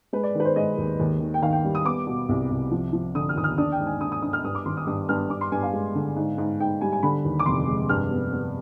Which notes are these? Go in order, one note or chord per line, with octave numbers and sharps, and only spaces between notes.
G#3 B4
D5
D#3 B4
C5
G#3 D#5
D#2
D#2
D#3
G5
D#3 F5
G5
G3
D#6
B3 D6
B2
C2
C2
F3
F3
D3 D#6
F6
D#2 D#6
F6
D4 D#6
G5
G#2
G#5
D4 D#6
D#6
D4 D#6
F6
G2 D#6
D6
G#1 C6
D#6
G2 D#6
G2 F6
G2 D6
C6
G2 G#5
F5
G#3
D3
G#2
G#2
G#2 G5
G3 G#5
G#5
D3 B5
D#2
D6
F1 C6
G#3
G2 F6
B3
B3